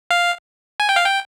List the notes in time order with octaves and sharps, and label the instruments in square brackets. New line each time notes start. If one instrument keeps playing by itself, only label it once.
[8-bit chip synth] F5
G#5
G5
F5
G5